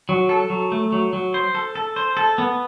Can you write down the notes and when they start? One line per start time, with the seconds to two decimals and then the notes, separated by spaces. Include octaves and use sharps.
0.09 F#3
0.29 A4
0.50 F#3
0.72 A3
0.92 F#3
1.13 F#3
1.34 C5
1.55 A4
1.75 A4
1.96 C5
2.17 A4
2.38 B3